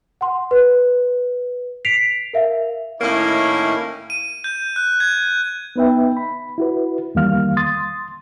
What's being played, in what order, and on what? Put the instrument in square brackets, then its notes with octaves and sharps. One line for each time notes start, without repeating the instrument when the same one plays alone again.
[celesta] F#5 C6
B4
B6 C7 D7 F7
A#4 E5 F5
[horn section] A2 D#3 A#3 C#4 E4 C#5
[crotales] D#7
G6
F#6
G#6
[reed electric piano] B3 D#4 B4 E5 G5
B5
E4 F#4 B4
E2 D#3 G3 A#3 F5 F6
C6 D#6 A6